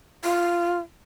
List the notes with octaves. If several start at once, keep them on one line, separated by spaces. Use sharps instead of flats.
F4